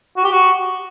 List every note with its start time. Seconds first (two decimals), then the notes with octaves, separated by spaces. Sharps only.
0.17 F#4
0.24 G4
0.31 F#4